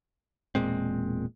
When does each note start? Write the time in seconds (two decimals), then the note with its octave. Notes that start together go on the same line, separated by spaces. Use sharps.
0.55 E1 A#2 G#3 C4